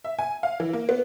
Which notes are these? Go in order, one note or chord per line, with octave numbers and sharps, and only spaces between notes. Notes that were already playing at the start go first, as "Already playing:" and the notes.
E5
G#5
F5
E3
A#3
B3